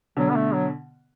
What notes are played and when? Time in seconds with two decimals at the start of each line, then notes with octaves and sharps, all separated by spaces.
0.17 B2 D3 F#3
0.30 B3
0.35 A3
0.53 F#3